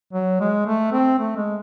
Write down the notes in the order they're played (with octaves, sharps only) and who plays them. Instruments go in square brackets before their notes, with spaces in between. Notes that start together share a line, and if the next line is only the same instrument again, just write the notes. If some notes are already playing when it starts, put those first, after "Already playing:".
[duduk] F#3
G#3
A3
C4
A3
G#3